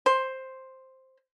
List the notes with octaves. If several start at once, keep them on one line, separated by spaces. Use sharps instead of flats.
C5